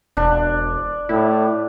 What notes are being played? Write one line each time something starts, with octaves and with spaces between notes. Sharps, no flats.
E1 D4
A2 E4